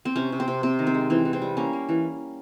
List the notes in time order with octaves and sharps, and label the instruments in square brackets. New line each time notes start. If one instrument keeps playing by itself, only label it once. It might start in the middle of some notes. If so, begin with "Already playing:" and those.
[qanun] C4
C3 C#4
C3
C4
C3
C3 C4
D#3
C4
G#3
E3 C4
E3
C4
G3
A#3 C#4
A#3
E3